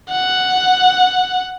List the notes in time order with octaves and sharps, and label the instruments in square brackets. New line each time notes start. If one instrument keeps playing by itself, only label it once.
[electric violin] F#5